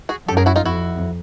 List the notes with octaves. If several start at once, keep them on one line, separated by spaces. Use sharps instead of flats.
F#4 G#4
F#2 G4 A4
G#4 A#4
E4 F#4
D#4 F4
F2 E4 F#4